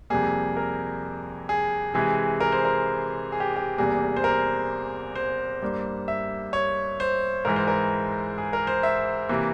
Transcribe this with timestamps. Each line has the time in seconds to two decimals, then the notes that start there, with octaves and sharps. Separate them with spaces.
0.10 F2 C3 G3 A#3 G#4
0.57 A#4
1.49 G#4
1.94 C3 E3 G#3 G#4
2.41 A#4
2.52 C5
2.65 A#4
3.32 G#4
3.40 G4
3.56 G4
3.78 E2 C3 G3 A#3 G#4
4.17 C5
4.24 A#4
5.15 C5
5.62 G2 G3 A#3
6.08 E5
6.53 C#5
7.00 C5
7.45 G#2 E3 G#3 A#4
7.56 C5
7.68 A#4
8.38 G#4
8.53 A#4
8.67 C5
8.83 E5
9.29 C3 E3 A#3